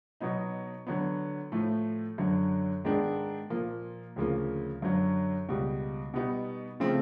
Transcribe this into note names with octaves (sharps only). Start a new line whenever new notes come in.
B2 F#3 B3 D#4
D3 F#3 B3
A2 F3 A3
F#2 D3 F#3
G#2 D#3 G#3 B3 D4
A#2 F3 A#3
D2 C#3 F3 A#3
F#2 D3 F#3
C#2 B2 G3
B2 G3 B3 D#4
C#3 F3 A3 C4